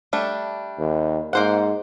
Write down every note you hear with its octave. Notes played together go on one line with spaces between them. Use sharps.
G3 A3 D4
D#2
G#2 A#3 C5 F#5